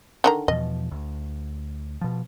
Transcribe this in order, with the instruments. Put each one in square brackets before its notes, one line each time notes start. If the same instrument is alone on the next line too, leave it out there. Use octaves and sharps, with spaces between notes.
[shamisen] D3 D#3 A#5
[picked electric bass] E2 B2 F3 [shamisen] D#5
[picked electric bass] D2
B2 F3